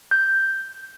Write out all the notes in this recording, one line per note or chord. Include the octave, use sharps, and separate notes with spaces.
G6